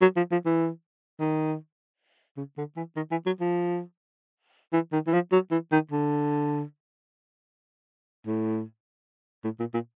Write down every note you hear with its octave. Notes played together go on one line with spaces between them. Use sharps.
F#3
F3
F3
E3
D#3
C#3
D3
E3
D#3
E3
F#3
F3
E3
D#3
E3
F3
F#3
E3
D#3
D3
A2
A2
A#2
A#2